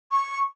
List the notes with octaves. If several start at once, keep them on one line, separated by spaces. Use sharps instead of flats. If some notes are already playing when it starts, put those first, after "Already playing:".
C#6